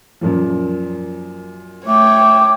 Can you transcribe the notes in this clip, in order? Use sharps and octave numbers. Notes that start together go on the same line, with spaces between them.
F#2 A#2 F3
A3 C#5 G5 D6